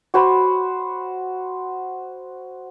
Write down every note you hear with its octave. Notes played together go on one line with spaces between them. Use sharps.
F#4 C5 B5